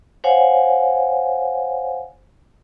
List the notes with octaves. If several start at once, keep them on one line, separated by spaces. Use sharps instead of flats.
C5 C#5 F5 F#5 G#5